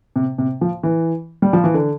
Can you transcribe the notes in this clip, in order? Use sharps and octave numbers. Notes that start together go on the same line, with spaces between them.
C3
C3
F3
E3
G3
F3
E3
D3